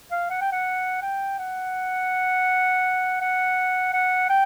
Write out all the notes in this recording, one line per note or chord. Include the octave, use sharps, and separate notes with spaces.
F5
F#5
G5
F#5
G5
F#5
F#5
F#5
G5